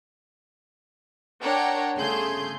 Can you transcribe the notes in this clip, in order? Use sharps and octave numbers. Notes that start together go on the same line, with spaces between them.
D4 A#4 C#5 F#5 G5
G1 C#3 A3 G#4 C6 G6